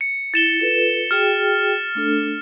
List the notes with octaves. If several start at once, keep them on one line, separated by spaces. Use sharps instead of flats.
C#7
E4 A6 E7 G7
F4 A4 B4
F#4 G#4 G5 F6
A3 D4 A4